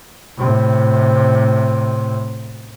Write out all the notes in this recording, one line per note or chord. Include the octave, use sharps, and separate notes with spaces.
A2 C3